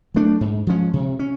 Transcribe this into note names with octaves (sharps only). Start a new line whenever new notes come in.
F#3 A3 D4
G#2
F3 G#3 C#4
C3
C#4